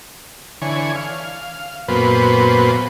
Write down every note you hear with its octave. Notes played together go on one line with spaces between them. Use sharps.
D3 E3 C#5 G#5
F5
F#2 A#2 B3 B4 C5